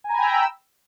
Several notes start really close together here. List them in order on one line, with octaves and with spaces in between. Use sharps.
G#5 A#5 B5 G5 E6